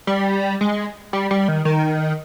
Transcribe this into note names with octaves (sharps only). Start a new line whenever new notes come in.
G3
G#3
G3
G3
D#3
D#3